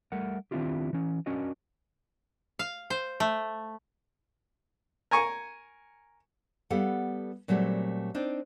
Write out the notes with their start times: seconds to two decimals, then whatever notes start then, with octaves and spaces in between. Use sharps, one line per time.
0.12 G3 A3 A#4 F#5
0.51 D#3 C4 D4 E4 F4 G4
0.93 E3 C#4
1.26 C#4 D4 F#4 A#4 D#5
2.59 F5
2.90 C5
3.20 A3
5.11 A#4 G#5 C#6
6.70 G3 B3 A4 F5 F#5
7.48 A#2 F#3 G3 A3 C4
8.15 C4 D4 D#4